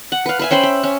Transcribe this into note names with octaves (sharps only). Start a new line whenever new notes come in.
F#5
B4 F5
B4 E5 G#5
C#4 C5 G5 B5
E5
C#4